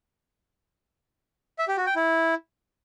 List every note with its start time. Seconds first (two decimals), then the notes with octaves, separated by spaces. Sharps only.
1.59 E5
1.68 G4
1.77 F#4
1.86 G5
1.96 E4